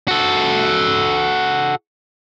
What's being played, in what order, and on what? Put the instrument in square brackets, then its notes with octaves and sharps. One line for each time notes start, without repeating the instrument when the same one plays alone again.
[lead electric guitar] F#4 A4